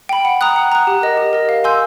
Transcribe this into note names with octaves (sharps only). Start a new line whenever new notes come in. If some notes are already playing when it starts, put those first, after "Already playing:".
G5 B5
F#5
A#5 D#6 F#6
F#5
A#5 D#6 F#6
G4
A#4 D#5
G4
A#4 D#5
F5
G#5 C6 E6 G6